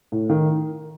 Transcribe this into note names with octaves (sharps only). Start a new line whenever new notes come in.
A2
D#3